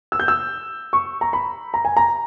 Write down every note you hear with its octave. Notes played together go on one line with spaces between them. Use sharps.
E6
G6
E6
C#6
A#5
B5
A#5
G#5
A#5